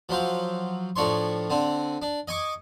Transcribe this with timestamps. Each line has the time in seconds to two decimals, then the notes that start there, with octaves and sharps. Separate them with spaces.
0.09 F3 F#3 C5 F5
0.96 A2 F3 D4 C#5 C6
1.50 D3 C4 D4
2.02 D4
2.28 D#5 G#5 C#6 D6